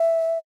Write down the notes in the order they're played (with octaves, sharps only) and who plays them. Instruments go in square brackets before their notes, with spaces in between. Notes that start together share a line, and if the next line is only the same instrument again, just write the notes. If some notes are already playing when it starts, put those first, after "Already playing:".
Already playing: [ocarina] E5